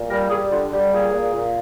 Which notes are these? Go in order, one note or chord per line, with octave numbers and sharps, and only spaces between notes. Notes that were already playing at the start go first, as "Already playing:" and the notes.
Already playing: A#2
G3 A#4
G3 G#4
D3 F4
G3 G4
A#2 G#4
A#2
A#2